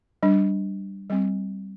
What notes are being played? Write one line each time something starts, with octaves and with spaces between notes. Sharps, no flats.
G3 D4
G3 C4